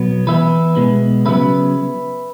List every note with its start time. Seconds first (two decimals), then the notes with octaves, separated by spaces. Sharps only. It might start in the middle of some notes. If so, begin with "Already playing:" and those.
Already playing: B2 F#3 B3
0.27 E3 B3 B4 E5
0.76 B2 G#3 B3
1.26 C#3 F#3 B3 B4 E5